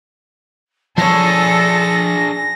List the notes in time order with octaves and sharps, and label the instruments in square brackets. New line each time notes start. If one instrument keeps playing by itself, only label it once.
[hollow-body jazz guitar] F3 C#5 [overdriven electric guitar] D4 G#4 [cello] A4 [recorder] A#6